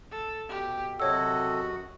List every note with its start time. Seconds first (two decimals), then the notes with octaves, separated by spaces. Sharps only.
0.11 A4
0.49 B2 G4
1.00 F#2 C3 F#4 A4 C#5 D#5 F#5 E6